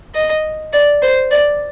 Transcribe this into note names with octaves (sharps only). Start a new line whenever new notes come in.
D#5
D5
C5
D5